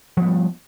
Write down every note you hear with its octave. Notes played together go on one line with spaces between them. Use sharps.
F3 G3 B3